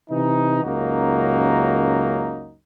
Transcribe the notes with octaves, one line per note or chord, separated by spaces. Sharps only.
C3 E3 D#4
C#2 F#2 A#3 D#4 F#4